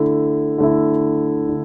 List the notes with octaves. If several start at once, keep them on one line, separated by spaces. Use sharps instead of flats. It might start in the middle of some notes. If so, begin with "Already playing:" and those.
Already playing: D3 A3 E4
D3 A3 E4
D3